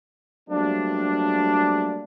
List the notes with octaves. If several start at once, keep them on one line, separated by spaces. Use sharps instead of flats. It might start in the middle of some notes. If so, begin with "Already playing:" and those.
F#3 G3 A3 A#3 C4 D4